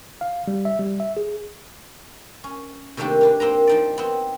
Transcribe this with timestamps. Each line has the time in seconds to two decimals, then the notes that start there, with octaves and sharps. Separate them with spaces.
0.21 F5
0.48 G3
0.65 E5
0.79 G3
1.00 E5
1.17 G#4
2.44 C#4
2.97 C3 D#3 A3 A#3 D4 G4
3.21 A#3 D4 B4
3.40 A#3 C4 B4 A#5
3.67 F3 D#4 D5
3.98 B3 C4